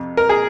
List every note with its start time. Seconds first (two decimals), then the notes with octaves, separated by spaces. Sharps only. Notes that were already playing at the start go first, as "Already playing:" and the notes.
Already playing: F2 C3
0.17 A#4
0.29 G#4